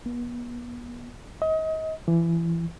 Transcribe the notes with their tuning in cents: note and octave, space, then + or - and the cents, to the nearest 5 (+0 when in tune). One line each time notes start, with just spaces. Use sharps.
B3 -40
D#5 +30
E3 +25